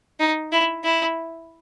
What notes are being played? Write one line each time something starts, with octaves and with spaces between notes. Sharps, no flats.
D#4
E4
E4